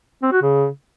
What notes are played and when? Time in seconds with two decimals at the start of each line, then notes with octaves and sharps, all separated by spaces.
0.23 C4
0.32 F#4
0.42 C#3